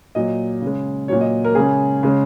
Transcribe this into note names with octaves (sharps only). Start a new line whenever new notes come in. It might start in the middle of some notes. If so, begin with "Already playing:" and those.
A#2 F#3 D#5
C#3
G#3
A#2 F#3 C#5
D#5
A#4
C#3 G#3 G#4
C#3 G#3